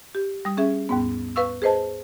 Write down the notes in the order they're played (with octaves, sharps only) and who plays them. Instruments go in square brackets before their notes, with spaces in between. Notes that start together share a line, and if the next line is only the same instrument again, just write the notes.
[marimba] G4
G3 D#6
C#4 G#4 E5
D#2 G#2 B3
B4 F5 C#6 E6
G#4 B4 C5 D#5 A5